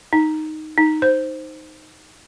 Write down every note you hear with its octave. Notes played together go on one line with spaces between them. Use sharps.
D#4
D#4
C5